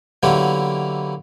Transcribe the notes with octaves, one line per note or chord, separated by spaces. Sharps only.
D3 F#3 A#3 B3 E4 G4